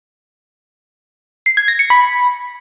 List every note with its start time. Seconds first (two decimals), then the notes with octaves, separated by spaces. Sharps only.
1.46 C7
1.57 G#6
1.68 A#6
1.79 C#7
1.90 B5